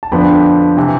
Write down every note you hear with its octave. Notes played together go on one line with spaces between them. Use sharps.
A5
F2 D3 F3 B3 D4 G5 B5
C3 E3